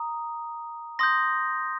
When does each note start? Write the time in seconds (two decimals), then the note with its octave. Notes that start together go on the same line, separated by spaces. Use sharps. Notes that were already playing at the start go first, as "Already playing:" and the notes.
Already playing: A#5 D#6
0.99 C6 D#6 G6 A#6